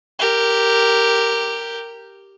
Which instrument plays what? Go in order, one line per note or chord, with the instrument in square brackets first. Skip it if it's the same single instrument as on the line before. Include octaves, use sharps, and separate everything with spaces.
[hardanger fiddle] G4 A#4